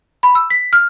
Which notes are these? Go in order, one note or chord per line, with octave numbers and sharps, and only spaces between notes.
B5
E6
B6
F6